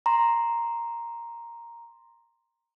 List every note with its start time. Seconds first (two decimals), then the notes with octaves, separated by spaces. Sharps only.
0.06 A#5 C6